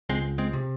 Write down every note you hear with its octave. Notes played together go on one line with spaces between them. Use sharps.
C#2 G#3 C4
G#3 C4
C3